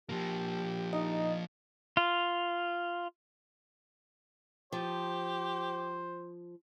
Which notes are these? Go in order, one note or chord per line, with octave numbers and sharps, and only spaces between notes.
F3 A#3 G4
D#4 D#5
F4
F3 G4 C5